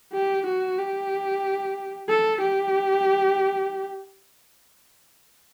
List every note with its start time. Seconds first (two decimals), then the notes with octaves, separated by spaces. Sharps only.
0.13 G4
0.46 F#4
0.78 G4
2.09 A4
2.41 G4